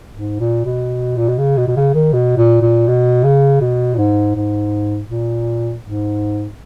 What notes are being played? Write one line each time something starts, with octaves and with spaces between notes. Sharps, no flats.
G#2
A#2
B2
A#2
B2
C#3
B2
B2
C#3
D#3
B2
A#2
A#2
B2
C#3
B2
A#2
G#2
G#2
A#2
G#2